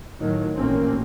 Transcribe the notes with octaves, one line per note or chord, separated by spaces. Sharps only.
A2 D#3 F#3
A1 A#2 A3 A#3 C4 C#4